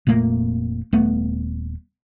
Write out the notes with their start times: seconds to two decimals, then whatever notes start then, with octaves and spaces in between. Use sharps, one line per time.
0.07 F1 A#2 A3 A#3
0.93 D#1 A3 B3